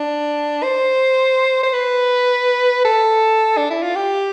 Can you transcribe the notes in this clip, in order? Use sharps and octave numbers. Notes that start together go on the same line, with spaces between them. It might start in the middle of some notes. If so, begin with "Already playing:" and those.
Already playing: D4
C5
C5
B4
A4
D4
E4
F4
G4